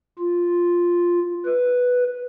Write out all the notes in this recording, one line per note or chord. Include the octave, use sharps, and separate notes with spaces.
F4
B4